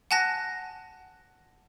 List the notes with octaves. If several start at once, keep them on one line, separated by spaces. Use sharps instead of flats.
F#5 G#5 A5 F#6 A#6